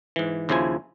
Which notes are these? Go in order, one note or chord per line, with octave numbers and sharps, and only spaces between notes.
G#2 E3
D#2 C#3 F3 E4 C5 G#5